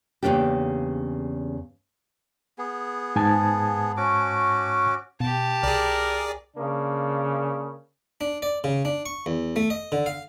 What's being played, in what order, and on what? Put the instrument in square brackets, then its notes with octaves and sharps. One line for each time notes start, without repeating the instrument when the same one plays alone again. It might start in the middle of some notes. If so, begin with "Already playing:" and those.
[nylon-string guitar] E2 A2 C#3 A#3 D4 G4
[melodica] B3 G#4
[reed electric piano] G#2 G#5 A5
[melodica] C#4 F#4 D6
[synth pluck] B2 [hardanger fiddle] G4 A5
[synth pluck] C2 [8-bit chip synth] G#4 D5 [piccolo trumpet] A#4
[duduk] C#3 [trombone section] A#3 D4
[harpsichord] D4
D5
C#3
D4
C#6
E2
A3
D#5
D3
F5